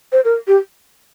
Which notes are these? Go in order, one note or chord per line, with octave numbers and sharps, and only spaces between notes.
C5
A#4
G4